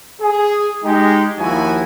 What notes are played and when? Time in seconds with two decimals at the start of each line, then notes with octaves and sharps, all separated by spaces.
0.21 G#4
0.84 G#3 D#4 G4
1.38 D#2 F3 A#3 E4 F#4 G#5